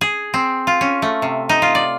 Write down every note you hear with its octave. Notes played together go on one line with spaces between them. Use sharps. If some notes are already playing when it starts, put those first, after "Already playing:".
G#4
C4
F4
C#4
A3
C3
D#4
F4
D5